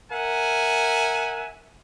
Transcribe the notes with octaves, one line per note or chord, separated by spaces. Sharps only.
A#4 E5 F#5 G#5